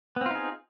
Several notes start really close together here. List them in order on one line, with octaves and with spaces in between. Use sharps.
B3 C4 F4 D#4 G#4